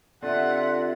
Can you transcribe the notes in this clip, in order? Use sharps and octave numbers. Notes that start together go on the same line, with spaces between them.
D3 C4 F4 G4 E5 F#5